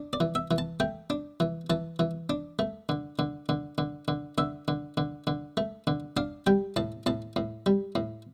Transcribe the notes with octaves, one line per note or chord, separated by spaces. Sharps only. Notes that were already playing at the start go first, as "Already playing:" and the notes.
Already playing: D4
D5
E3
E5
E3
A5
A3 G5
D4
E3
E3 A5
E3
D4
A3
D3
D3
D3
D3
D3
D3 E5
D3
D3
D3
A3
D3
D4 F5
G3 G5
A2 A5
A2 A5
A2
G3
A2